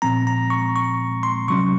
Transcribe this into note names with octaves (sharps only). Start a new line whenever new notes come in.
A#2 F3 C4 A#5
A#5
C#6
C#6
C6
C3 F#3 C#4 C#6